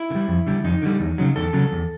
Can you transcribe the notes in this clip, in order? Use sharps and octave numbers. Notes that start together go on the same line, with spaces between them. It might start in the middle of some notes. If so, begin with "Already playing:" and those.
Already playing: E4
D3
G3
F2
D3 G3
F2 D#4
D3 G3
E2
C#3 F#3
E2 A4
C#3 F#3
E2